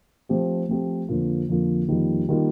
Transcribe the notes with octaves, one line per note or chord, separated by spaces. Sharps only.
F3 A3 C4 G4
F3 A3 C4 G4
F2 D3 F3 A#3 F4
F2 D3 F3 A#3 F4
F2 D#3 G3 A#3 F4
D#3 G3 A#3 F4